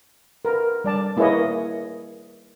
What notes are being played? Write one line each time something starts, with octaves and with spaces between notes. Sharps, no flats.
A#4 B4
G3 D5 A5
A#3 E4 G#4 B4 C#5 D#5